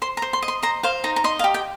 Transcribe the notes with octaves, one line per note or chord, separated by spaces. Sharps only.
C5 C6
A#5
C5
C6
D#5
C6
C5 A#5
C5 F5
D#4 A#5
A#5
D#5 C6
F5
G4
G5